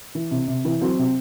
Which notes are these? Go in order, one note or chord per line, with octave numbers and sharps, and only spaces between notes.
E3
C3
C3
E3
F#3 C4
C3